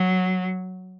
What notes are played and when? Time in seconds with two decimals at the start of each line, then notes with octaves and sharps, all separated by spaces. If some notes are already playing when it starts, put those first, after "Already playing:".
Already playing: F#3